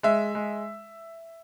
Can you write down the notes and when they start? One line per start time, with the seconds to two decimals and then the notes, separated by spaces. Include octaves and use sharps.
0.03 G#3 E5
0.35 G#3